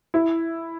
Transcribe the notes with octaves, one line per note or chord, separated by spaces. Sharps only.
E4